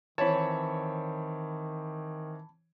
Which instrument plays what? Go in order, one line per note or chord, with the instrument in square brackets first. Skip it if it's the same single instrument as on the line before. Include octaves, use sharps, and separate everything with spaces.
[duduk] D#3 [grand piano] E3 C4 [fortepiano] C#5 [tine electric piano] A5 B5